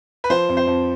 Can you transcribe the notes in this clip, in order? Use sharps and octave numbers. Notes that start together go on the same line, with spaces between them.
B4
F3 C5
F2
C5
F2